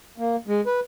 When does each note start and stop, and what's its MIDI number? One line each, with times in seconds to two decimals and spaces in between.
0.18 0.36 58
0.47 0.61 56
0.66 0.80 71